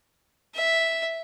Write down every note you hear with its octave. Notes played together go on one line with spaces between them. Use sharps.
E5